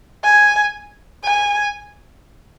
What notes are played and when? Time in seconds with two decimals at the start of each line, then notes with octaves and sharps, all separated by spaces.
0.24 G#5
1.24 G#5